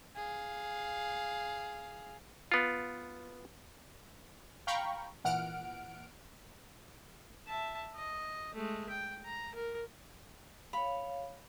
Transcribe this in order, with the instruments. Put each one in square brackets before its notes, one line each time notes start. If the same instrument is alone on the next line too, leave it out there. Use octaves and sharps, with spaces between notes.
[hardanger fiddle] G#4 F5
[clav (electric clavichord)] B3 F4
[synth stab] F5 G5 A#5 B5 C#6
G#1 A#2 E3 F#5 F6 D7
[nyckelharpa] E5 A5
D#5
G#3 A3
G5
A#5
A#4
[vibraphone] C#5 F5 [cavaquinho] B5